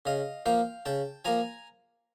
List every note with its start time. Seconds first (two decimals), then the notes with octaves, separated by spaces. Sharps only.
0.05 C#3 D#5 F5
0.46 F3 A#3 F5 G5
0.86 C#3 G5 A5
1.25 F3 A#3 G#5 A#5